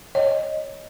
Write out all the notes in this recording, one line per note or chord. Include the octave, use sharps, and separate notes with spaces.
C#5 D#5